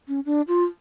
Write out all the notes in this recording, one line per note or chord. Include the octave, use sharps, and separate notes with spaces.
C#4
D4
F4